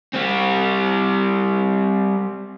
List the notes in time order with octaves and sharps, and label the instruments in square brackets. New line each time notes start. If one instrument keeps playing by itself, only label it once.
[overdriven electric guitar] G3 C4